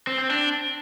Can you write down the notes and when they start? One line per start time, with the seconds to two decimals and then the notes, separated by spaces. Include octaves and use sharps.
0.07 C4
0.19 C4
0.30 D4